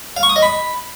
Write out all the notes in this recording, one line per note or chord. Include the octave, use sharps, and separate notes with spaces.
F5
C#6
D#6
D#5
B5